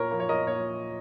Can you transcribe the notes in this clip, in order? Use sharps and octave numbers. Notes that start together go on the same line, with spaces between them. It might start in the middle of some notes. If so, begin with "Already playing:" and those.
Already playing: A#2 A#4 C#5
F3 A#3
C#5
A#4 D#5
A#2 C#5